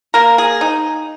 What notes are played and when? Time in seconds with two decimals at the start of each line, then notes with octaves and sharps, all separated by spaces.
0.14 A#3 A#4
0.38 G#4
0.61 D#4